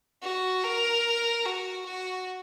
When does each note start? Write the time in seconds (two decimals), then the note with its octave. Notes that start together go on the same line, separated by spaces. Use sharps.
0.22 F#4
0.64 A#4
1.46 F#4
1.86 F#4